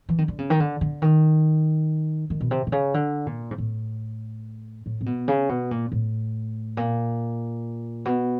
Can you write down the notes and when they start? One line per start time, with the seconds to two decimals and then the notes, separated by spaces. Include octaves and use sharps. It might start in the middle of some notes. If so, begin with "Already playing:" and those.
0.09 E3
0.18 D#3
0.28 D3
0.39 C#3
0.50 D#3
0.60 D3
0.81 D3
1.02 D#3
2.30 D#3
2.40 B2
2.51 C3
2.67 C3
2.72 C#3
2.94 D3
3.26 A#2
3.51 G#2
3.58 A2
4.86 A2
5.01 C3
5.06 B2
5.28 C#3
5.49 B2
5.71 A#2
5.92 A2
6.77 A#2
8.05 B2